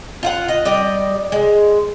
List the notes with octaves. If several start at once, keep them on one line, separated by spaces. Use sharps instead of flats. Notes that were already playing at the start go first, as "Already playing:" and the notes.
F4 F5 F#5
D#5
G3 D5 D#5
G#3